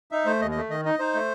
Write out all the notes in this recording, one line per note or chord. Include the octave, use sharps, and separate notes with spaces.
D#4 E5
A3 C5
D#2 D#5
A3 D#5
D#3 D#5
D#4 D#5
D#4 C5
A3